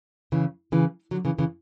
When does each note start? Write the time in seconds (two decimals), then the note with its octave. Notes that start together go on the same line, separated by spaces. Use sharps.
0.32 C#3 E3
0.72 C#3 E3
1.11 D3 F#3
1.25 C#3 E3
1.38 C#3 E3